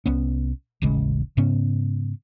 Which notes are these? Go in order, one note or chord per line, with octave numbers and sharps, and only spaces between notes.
C2 B3 C#4
D#1 A1 C#3 G#3
G#2 C#3 B3 C#4